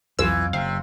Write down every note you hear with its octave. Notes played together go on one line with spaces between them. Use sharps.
C2 F2 E3 F#3 F4 E6
F#1 C3 F5